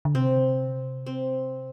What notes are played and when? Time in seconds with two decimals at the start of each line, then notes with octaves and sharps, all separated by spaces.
0.05 D3
0.15 C3 C4
1.06 C4